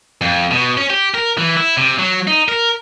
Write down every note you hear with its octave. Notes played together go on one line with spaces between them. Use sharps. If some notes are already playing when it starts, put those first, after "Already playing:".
F2
B2
C#4
G4
A#4
E3
E4
C3
F#3
D#4
A#4